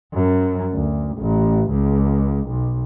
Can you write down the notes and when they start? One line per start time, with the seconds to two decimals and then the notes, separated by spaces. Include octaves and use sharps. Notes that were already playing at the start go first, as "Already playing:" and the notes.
0.13 F#2
0.73 D2
1.17 A1
1.70 C#2
2.48 B1